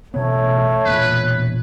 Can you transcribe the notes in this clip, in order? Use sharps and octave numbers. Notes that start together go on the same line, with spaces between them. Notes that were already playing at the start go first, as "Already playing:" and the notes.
A1 B2 A3 B3 C#5
E1 A#2 G#3 B4